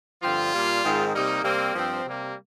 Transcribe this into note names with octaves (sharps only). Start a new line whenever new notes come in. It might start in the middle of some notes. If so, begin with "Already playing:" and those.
G2 D3 F3 C4 F4
A#2 G3 A#3
G#2 D#3 G#3 C4
C3 G3 A#3 D#4
C3 G3 A#3 C4
G2 F3 C4
C3 G3 A#3